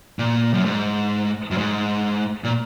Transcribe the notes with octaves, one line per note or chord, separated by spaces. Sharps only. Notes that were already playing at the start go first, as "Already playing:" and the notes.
A#2
F#2
G#2
F#2
G#2
A#2